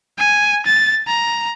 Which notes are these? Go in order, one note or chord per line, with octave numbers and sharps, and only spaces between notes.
G#5
A6
A#5